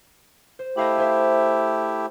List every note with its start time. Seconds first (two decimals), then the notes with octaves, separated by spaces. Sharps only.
0.59 C5
0.77 A3 E4 G4 D#5 F5 B5
0.98 G#4 C5 E5